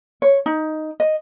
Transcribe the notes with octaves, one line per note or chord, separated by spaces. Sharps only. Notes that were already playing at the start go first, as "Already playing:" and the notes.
C#5
D#4
D#5